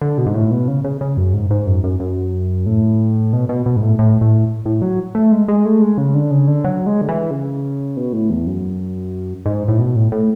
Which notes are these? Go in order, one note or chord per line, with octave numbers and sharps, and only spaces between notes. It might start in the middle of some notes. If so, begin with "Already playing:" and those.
D3
B2
G#2
A2
B2
C#3
C#3
C#3
F#2
G#2
G#2
F#2
F#2
F#2
A2
B2
B2
B2
G#2
A2
A2
A2
A2
F#3
A3
G#3
G#3
A3
G#3
C#3
D3
C#3
D3
F#3
G#3
D3
E3
C#3
B2
A2
E2
F#2
G#2
A2
B2
A2
A2